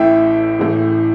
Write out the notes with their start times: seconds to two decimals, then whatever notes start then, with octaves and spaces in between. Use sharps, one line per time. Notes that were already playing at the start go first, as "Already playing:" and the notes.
Already playing: A1 A2 E3 E5 G5
0.59 A1 A2 E3